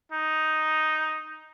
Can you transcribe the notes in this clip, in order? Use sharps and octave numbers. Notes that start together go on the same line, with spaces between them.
D#4